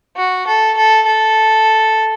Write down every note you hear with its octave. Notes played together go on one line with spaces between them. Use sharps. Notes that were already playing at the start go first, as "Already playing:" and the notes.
F#4
A4
A4
A4